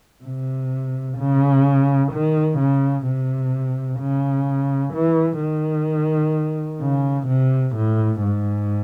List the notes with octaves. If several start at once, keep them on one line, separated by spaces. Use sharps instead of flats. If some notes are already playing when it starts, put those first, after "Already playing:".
C3
C#3
D#3
C#3
C3
C#3
E3
D#3
C#3
C3
A2
G#2